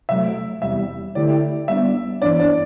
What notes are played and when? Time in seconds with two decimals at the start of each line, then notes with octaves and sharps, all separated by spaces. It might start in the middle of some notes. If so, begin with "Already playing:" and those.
0.09 C3 F#3 A3 E5
0.62 E2 C3 G3 E5
1.15 D3 A3 E4 G4 D5
1.68 G3 B3 D4 E5
2.22 G2 E3 B3 D4 D5
2.40 D5